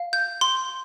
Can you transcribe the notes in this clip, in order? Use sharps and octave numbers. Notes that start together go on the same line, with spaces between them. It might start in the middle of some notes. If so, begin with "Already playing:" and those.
Already playing: F5
G6
C6